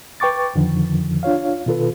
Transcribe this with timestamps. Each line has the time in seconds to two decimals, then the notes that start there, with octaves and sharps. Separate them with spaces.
0.20 B4 G5 C#6 D6 A6
0.55 F2 D3 D#3 F3
1.23 D4 F4 C#5 F5
1.66 B2 D#3 F4 A4 B4